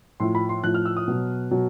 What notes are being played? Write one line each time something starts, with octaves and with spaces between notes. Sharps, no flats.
A2 F3 C6
B5
C6
A2 F3 F#6
F6
E6
D#6
B2 F#3
B2 F#3